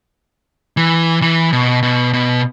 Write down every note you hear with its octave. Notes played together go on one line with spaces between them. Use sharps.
E3
E3
B2
B2
B2